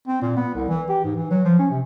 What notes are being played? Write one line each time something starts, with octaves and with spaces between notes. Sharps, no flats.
C4
A#2
B3
C2
E3
G4
G#2
E3
F#3
F3
C#4
C3